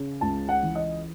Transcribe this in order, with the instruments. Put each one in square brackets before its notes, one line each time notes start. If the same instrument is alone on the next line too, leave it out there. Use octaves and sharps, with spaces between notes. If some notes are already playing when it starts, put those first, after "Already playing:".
Already playing: [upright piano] C#3
C#2 A5
F#5
E3
D#5